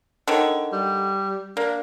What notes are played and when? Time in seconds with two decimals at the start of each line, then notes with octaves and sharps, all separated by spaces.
0.28 D3 D#3 C#5
0.73 G3
1.57 A#3 D4